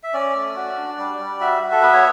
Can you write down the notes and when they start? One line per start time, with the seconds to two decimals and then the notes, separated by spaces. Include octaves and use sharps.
0.03 E5
0.14 C#4 D5
0.35 A3
0.55 F#4
0.77 D4
0.98 G3
1.19 G3
1.40 F#4 E5
1.62 F#4
1.72 A4
1.82 B3 B4
1.93 C#5